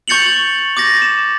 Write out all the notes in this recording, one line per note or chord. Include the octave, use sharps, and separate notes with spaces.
C#6 G6 A6 C#7 F7 F#7
D6 G6 A6 A#6
E7